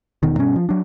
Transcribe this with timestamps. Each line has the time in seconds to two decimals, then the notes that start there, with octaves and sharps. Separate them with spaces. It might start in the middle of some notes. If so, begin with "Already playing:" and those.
0.23 E1 B2 D#3
0.37 G2 B2 C#4
0.56 F3
0.69 F#3 D4